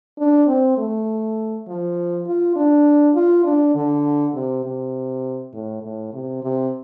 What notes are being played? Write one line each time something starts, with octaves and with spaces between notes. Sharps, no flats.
D4
C4
A3
F3
F4
D4
F4
D4
D3
C3
C3
A2
A2
C3
C3